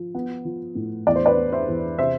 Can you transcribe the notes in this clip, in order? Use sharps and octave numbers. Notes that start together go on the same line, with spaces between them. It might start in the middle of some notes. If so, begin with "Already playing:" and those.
Already playing: F3
B3
F3
A2
E2 D5
C5
B4 D5
B3
C5 E5
E2
C3 C5 E5